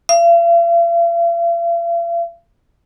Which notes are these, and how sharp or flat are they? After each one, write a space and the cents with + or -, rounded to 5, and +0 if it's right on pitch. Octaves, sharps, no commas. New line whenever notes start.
F5 -45